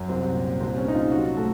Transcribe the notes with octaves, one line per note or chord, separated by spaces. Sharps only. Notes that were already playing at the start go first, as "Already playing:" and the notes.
Already playing: F#2
C2 C4
A#2
C2 C4
C#4
C2 D#4
F4
F#3 F#4
A2 A4